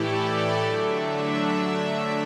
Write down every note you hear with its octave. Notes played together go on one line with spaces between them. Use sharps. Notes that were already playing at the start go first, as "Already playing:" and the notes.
Already playing: A2 E3 A3 E4 G4 A4 D5
D3 F#3 A3 D4 E5
E5